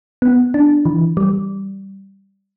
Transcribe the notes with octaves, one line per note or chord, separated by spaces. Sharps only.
B3
D4
E3
G3